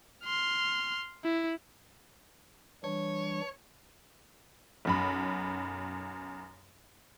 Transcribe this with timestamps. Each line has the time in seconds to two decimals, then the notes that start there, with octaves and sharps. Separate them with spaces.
0.25 C6 F6
1.24 E4
2.84 E3 G3 D4 C#5
4.85 B1 F#2 B5